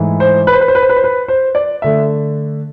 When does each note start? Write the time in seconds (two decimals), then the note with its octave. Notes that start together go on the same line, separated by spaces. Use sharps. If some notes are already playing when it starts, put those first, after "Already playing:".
Already playing: G#2 E3 A3 E4
0.20 C5
0.47 B4
0.53 C5
0.61 B4
0.68 C5
0.75 B4
0.82 C5
0.89 B4
0.97 C5
1.04 B4
1.28 C5
1.55 D5
1.82 D3 A3 E5